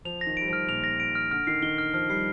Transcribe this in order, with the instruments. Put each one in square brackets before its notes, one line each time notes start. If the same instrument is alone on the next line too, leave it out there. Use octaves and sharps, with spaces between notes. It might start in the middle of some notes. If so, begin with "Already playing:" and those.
[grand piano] F3 [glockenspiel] F7
[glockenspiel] A#6
[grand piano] D#3
[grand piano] G3 [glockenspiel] D7
[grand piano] F3
[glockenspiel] F6
[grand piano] A#2 [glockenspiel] F7
[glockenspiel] A#6
D7
F6
[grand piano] D3 [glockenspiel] F6
[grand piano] D#3 [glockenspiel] C7
[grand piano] D#3 [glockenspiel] G7
[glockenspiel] F6
[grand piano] F3 [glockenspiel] F6
[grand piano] G3 [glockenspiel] C7